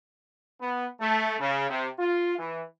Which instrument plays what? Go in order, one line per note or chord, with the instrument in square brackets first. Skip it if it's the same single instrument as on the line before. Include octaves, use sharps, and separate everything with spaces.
[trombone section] B3
A3
C#3
C3
F4
E3